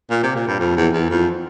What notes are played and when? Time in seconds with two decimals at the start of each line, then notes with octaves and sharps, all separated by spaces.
0.10 A#2
0.23 C3
0.36 A#2
0.47 G2
0.60 F2
0.76 E2
0.93 E2
1.10 F2